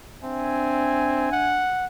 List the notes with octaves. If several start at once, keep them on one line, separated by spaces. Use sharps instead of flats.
C4 D4 E5 G#5
F#5